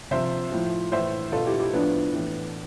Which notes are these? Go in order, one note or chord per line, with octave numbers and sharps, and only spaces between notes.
C3 F3 C5 E5
A2 F3
A2 E3 C5 E5
B2 F4 A4
E4 G4
E4 G4
A2 F3 B3 D4
A2 E3